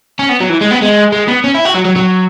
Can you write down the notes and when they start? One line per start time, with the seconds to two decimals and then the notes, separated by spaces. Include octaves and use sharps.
0.19 C#4
0.29 B3
0.40 F#3
0.50 E3
0.61 G#3
0.71 B3
0.82 G#3
1.12 G#3
1.28 B3
1.44 C#4
1.55 E4
1.65 F#4
1.75 F#3
1.85 F#3
1.96 F#3